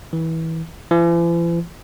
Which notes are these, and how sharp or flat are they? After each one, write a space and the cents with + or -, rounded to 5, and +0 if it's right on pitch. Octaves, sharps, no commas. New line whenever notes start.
E3 -25
E3 +45